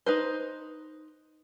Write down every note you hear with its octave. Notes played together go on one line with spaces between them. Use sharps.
D#4 B4 C5